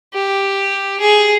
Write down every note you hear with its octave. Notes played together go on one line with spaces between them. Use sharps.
G4
G#4